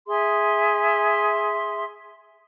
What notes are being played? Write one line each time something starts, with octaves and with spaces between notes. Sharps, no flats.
G#4 E5 C6